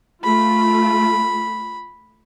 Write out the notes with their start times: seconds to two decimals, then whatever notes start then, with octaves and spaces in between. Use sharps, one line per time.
0.24 A3 F4 B5